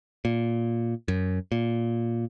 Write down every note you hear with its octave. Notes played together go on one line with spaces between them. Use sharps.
A#2
F#2
A#2